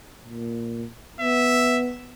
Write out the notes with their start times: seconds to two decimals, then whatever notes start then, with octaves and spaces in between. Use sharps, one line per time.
0.25 A#2
1.20 B3 E5